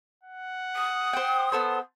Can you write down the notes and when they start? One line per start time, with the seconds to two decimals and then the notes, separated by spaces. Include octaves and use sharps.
0.23 F#5
0.75 D#6
1.13 C5 G5
1.52 B3 A4 C5